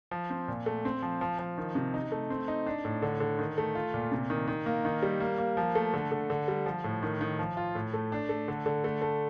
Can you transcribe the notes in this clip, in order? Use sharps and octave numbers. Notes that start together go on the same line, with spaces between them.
F3
C4
A#2
A3
C4
F3
F3
F3
D#3
C3
D#4
A3
C4
D#4
D4
A2
D3
D3
D#3
A3
F4
A#2
C3
D#3
D#3
A#3
D#3
G3
A#3
A#3
F3
A3
D3
D3
D3
G3
F3
A2
D#3
D#3
F3
F4
A2
A3
D4
A3
D3
D3
A3
A3